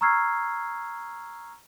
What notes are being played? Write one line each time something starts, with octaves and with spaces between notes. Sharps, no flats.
A#5 C#6 E6 F6 G#6 C7